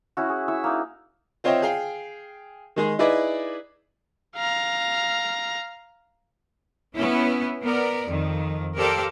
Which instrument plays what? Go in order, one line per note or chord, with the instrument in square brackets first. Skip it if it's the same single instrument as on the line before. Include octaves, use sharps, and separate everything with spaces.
[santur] C#4 E4 F#4
G#4
E4 C#6 E6
A#3 D#4
[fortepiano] C4 F4 C#5 D#5 E5 G5
G#4 F5 G5
D#3 G#3 G#4
D#4 E4 G#4 B4 D5 D#5
[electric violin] F5 A#5
[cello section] B3 C#4 E4
B3 A#4 D5
F2 D#3
G4 A4 A#4 C5 D5 F5